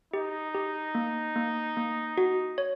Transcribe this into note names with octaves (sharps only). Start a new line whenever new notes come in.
D#4 G4
G4
A#3
A#3
A#3
F#4
C#5